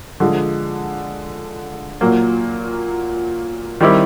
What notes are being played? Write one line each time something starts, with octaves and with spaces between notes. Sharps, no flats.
D3 F3 G#3
A#2 F#3 A#3
D#3 G3 C4 E4 G4